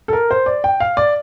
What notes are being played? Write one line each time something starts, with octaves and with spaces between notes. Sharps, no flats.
A4
A#4
C5
D5
G5
F5
D5